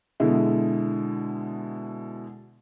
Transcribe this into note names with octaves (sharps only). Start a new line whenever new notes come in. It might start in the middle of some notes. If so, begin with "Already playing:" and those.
B2 D3 G#3 E4